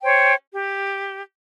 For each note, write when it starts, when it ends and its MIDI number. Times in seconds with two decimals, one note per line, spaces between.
0.02 0.33 72
0.02 0.33 73
0.02 0.33 79
0.53 1.22 67